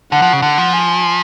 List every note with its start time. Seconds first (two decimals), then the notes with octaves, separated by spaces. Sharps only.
0.12 D3 F#5
0.22 F3
0.33 C#3
0.42 D3 F#5
0.58 F3
0.73 G#5